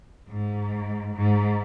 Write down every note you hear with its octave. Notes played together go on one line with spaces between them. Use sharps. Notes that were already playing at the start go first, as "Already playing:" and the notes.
G#2
G#2